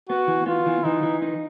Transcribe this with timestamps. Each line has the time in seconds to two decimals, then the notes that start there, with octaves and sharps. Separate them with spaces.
0.09 B3 F#4
0.28 E3
0.46 B3 F4
0.66 E3
0.84 E3 D#4
1.03 E3
1.22 D#4